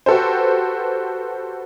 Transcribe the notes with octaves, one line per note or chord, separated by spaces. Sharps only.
F#4 G4 A4 B4 C5